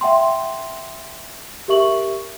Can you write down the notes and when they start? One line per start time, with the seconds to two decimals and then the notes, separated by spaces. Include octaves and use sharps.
0.01 E5 F#5 G5 A#5 C6
1.68 G4 A#4 E5 C#6 F#7